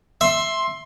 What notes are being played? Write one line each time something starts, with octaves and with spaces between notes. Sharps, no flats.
E5 C6